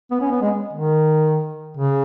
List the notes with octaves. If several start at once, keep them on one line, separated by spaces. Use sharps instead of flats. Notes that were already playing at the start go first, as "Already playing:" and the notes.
B3
C#4
B3
G#3
D#3
C#3